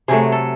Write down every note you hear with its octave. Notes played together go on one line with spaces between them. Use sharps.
C3 F#3 A3 G#4
A4